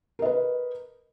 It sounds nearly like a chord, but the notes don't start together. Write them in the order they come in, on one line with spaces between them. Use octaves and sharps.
A#4 D#5 B4